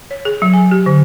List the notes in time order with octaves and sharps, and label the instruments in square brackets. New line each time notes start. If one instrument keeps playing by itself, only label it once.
[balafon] C#5
G#4
F#3
G#5
G4
D3